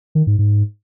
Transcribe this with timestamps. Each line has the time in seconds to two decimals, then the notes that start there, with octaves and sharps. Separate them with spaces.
0.15 D#3
0.27 G#2
0.39 G#2